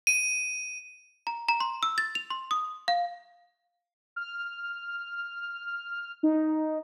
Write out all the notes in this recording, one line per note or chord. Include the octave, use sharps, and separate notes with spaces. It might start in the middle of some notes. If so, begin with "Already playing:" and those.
D#7
A#5
A#5
C6
E6
A6
F7
C6
D#6
F5
F6
D#4